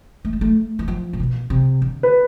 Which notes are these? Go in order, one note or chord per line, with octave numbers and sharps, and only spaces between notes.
A3
G3
A3
E3
F3
A2
B2
C3
D3
B4